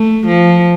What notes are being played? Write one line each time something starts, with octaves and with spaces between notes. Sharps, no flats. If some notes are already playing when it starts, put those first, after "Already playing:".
Already playing: A3
F3